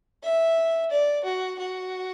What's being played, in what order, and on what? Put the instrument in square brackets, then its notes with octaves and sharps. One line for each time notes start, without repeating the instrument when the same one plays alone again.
[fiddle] E5
D5
F#4
F#4